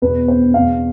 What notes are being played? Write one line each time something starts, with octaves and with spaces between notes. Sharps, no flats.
E2 B2 B4
C5
E2 B2 F5